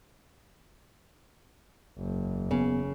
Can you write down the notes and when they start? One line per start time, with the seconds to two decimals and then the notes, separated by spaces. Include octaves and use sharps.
1.98 F#1 E2
2.51 C#3 B3